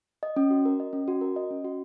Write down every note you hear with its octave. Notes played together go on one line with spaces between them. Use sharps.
D#5
C#4
F#4
A#4
D#5
C#4
F#4
A#4
D#5
C#4
F#4